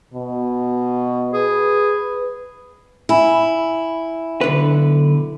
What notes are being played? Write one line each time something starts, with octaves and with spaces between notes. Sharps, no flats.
B2
G#4 B4
E4 E5 G#5 B5
B1 D3 B4